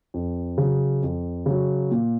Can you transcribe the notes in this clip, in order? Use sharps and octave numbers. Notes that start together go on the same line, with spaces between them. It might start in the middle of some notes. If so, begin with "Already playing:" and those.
F2
C#3 F#3
F2
C#3 F#3
A#2